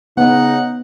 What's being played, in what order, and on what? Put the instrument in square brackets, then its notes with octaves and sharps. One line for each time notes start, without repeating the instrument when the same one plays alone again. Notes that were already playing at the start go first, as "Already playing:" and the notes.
[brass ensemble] C#3 D#4 [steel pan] B3 [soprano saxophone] F#5